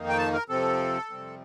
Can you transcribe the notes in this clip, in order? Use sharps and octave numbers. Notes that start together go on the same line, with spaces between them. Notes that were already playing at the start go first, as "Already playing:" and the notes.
Already playing: F2 D#3 A#3 D#4
G5
A5
A#4
F2 C3 F3 C4 A4
F2 C3 G3 C4